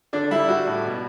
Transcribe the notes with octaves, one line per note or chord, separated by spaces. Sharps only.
D3 D4
G3 E4
G3 F#4
A2
B2